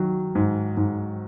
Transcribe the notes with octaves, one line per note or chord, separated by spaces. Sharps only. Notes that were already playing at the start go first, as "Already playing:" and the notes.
Already playing: D#3 F#3
G#2
G#2